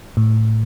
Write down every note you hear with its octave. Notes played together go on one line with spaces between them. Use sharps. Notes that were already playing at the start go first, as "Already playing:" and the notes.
A2